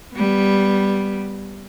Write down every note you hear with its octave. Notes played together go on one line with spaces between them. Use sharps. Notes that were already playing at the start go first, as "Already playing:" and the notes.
G3 B3